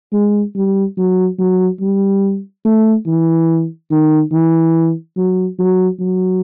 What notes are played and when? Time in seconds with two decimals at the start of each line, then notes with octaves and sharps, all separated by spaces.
0.13 G#3
0.55 G3
0.98 F#3
1.39 F#3
1.81 G3
2.65 A3
3.06 E3
3.91 D#3
4.32 E3
5.17 F#3
5.59 F#3
6.00 F#3